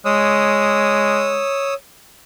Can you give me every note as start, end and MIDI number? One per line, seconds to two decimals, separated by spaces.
0.05 1.47 56
0.05 1.74 73
0.05 1.74 87
0.05 1.74 88